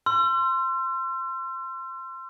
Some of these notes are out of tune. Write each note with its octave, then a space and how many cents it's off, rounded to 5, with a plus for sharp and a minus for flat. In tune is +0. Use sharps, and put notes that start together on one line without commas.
C6 +0 E6 +45